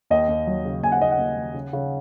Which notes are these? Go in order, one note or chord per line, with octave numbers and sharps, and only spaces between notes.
D#2 D#5
D#2
F#3
C#3
D#2 G#5
F#5
D#2 D#5
F#5
D#2
D#2
C#3
C#3